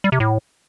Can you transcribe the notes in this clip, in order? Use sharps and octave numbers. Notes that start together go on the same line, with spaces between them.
G3
C3
A2